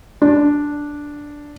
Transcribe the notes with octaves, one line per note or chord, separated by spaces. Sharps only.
D4